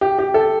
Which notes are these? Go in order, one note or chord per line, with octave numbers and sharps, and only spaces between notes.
G4
G4
A4